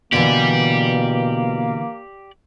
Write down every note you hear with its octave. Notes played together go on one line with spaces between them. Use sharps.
B2 D3 E3 A#3 G4 D5